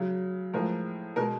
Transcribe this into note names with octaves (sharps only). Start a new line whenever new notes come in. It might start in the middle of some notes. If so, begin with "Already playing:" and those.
Already playing: C#3 F#3
A2 F3 G#3 A#4
B2 G#3 A#4